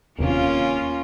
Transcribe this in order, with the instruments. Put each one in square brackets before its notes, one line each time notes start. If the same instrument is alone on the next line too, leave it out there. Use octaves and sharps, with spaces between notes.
[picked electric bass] D#1 D#2 C3 [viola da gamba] A#3 C#4 F4